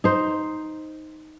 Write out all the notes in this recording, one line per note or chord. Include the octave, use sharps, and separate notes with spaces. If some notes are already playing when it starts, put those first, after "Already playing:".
D#4 C5